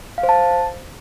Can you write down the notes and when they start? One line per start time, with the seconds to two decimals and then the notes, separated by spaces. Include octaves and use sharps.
0.18 F5
0.23 C5
0.29 A5